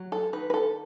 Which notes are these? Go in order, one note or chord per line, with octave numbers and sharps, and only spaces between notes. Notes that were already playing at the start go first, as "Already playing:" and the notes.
Already playing: F#3
A4
D#3 B4
B4
A4